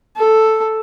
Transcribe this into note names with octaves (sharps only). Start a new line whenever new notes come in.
A4